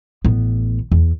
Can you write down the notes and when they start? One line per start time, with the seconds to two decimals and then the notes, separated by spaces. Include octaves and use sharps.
0.25 A1 B3
0.92 E2